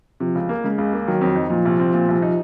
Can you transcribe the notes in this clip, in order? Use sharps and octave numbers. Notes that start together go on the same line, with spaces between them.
C3 F3
C#2
A#3
C#3 G#3
C#2
A#3
D#3 F#3
F2
D#4
A#2 F3
C2
C4
A#2
C2
D#4